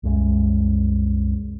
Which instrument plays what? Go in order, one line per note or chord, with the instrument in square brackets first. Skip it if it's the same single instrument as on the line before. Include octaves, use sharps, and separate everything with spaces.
[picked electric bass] C2 F#2 G#3